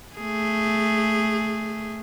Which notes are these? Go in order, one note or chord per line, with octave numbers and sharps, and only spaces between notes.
A3 G#4